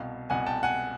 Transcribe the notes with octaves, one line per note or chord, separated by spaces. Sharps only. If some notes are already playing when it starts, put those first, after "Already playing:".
Already playing: C2 B2 F5 G5
C2 B2 F#5 G#5
G5 A5
F#5 G#5